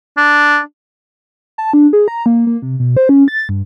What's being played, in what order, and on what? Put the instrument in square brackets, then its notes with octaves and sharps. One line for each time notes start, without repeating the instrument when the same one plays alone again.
[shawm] D4
[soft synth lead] A5
D4
G#4
A#5
A#3
A#3
C3
B2
C5
C#4
A6
G2